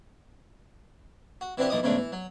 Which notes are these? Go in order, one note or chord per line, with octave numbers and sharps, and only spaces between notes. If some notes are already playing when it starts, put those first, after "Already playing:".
F#4
E3 C4 D4 E4 F#4 G4
B1 A#2 E3 D#5 D6 D#6
E2 G#2 C#3 A3 D4
E3
F#3